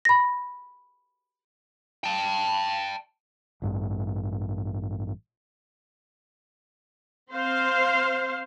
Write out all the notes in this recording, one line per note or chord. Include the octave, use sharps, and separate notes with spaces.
B5 A#6
G5 A5
A1 G2
C4 C5 F5